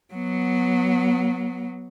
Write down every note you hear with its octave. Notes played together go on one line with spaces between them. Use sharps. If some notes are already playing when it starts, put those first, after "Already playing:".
F#3 B3